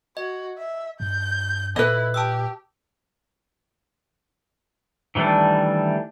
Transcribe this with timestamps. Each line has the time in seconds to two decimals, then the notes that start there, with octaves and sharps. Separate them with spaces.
0.17 F#4 D#5
0.57 E5
1.00 G2 G6
1.76 A#2 E4 A4 B4 D#5
2.14 G4 A5 D#6 E6
5.15 D#3 E3 G3 A3 D4